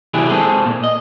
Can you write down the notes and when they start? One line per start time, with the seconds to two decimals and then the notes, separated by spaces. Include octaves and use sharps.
0.14 C3 E3 F#3 E4 G4 G#4
0.29 G#3 C4 G#4 A4
0.66 A#2
0.84 D#5